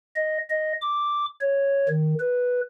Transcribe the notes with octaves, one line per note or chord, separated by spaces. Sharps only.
D#5
D#5
D6
C#5
D#3
B4